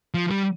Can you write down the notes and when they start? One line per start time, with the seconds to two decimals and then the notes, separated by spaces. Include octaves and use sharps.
0.14 F3
0.31 G3